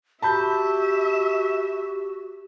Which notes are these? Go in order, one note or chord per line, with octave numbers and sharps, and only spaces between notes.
F#4 G4 E5 A5 B5 G6